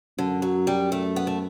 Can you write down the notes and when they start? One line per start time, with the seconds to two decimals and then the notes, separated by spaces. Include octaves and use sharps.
0.18 F#2 D3
0.42 F#3
0.67 G3
0.92 A3
1.16 B3
1.27 A3